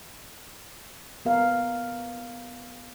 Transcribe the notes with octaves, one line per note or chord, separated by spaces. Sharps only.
B3 A#4 F5